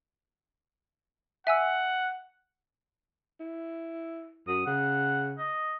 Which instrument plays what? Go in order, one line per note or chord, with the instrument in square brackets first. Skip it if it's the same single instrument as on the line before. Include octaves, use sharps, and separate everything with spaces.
[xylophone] E5 G#5 E6 [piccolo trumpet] F#5
[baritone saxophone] E4
[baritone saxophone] F#2 [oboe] D#6
[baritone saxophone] C#3 [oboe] F#5
[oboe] D#5